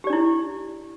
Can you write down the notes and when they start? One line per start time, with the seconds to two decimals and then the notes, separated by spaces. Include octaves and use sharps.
0.04 G4
0.07 D5
0.10 D4
0.13 E4